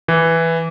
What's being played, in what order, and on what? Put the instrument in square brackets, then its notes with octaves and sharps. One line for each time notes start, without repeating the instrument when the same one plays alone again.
[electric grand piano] E3